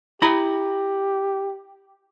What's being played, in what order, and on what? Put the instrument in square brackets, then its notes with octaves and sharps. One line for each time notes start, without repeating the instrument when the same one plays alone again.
[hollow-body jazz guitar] E4 A#5 B5 [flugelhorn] G4